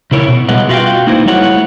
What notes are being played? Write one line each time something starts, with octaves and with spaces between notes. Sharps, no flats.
C#3 E4 A#4 C#5
B2
G3 B3 G#4 B4 D#5 F#5
F4 F#4 E5 F5 G5
A#3 D#4 E4 F#4 B4 C5
G3 A3 E4 C#5 F#5